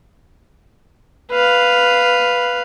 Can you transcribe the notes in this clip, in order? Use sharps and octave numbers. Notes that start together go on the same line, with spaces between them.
B4 F5